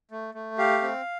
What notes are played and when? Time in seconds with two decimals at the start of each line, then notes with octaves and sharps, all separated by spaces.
0.11 A3
0.35 A3
0.58 G4 F5
0.82 C4